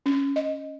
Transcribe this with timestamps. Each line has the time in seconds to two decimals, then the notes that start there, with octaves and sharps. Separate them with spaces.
0.06 C#4
0.36 D#5